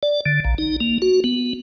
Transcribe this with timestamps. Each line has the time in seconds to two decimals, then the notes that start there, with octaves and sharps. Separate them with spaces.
0.03 D5
0.26 D3
0.45 A#1
0.58 D#4
0.81 A#3
1.02 F#4
1.24 B3